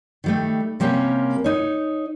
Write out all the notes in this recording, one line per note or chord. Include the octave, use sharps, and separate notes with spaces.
D#3 G3 A3
C3 G3 A#3 C#4
D#4 C#5